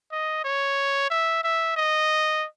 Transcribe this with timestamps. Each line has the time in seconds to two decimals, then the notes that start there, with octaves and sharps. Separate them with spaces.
0.12 D#5
0.44 C#5
1.10 E5
1.44 E5
1.77 D#5